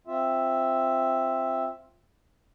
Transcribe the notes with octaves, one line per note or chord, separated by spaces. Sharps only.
C4 F4 E5